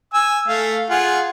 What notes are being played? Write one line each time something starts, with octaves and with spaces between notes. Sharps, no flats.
G#5 E6
A3 F5
F4 G#4 F#5